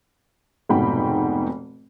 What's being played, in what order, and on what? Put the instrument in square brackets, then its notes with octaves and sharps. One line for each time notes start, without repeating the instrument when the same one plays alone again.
[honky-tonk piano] F1 G#2 B2 F#4 G5 B5